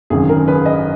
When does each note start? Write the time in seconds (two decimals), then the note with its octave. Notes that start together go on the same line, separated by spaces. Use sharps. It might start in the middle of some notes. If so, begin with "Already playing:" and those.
0.10 G#1 F#2 D#3 G#4
0.29 A#4
0.48 B4
0.66 D#5